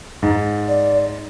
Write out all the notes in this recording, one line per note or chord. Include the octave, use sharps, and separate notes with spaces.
G#2
D5